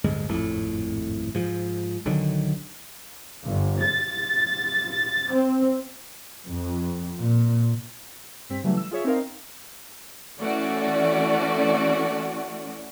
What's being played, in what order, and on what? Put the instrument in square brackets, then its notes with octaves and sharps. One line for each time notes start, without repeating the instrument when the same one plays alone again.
[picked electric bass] D1 D2 G2 G#3
D#1 G#1 F2 A2
G#2 F3
B1 D3 D#3 F#3
[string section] G1
A6
C4
[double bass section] F2
A#2
[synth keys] G2 C4 B6
C#3 E3 F#3 G3 A3
E6
F4 G#4 C#5 E5
C4 D#4 A#4 F5
[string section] E3 A3 C#4 F#4 D5